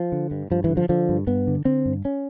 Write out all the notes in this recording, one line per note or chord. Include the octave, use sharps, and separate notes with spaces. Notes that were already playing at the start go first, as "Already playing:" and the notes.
Already playing: F3
D3
G2
G2 F3
E3
D3
F3
D3 F3
G2
G2 B3
D3
D3 C4
G2
C#4